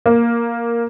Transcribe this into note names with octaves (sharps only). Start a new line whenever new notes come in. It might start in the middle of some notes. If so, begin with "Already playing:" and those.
A#3